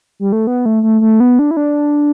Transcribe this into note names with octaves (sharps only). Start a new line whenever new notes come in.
G3
A3
B3
A3
A3
A3
B3
D4
E4
D4